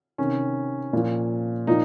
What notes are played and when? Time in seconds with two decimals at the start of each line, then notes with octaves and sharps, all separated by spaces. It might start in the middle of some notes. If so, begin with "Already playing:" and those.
0.18 C3 D#3 C#4
0.93 A#2 F3
1.67 A#2 F3 D#4